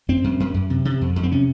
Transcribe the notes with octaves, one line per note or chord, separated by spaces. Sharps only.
F#2 C4
F#2
F#2
F#2
C3
C3
F2
F2
C4
C3 C#4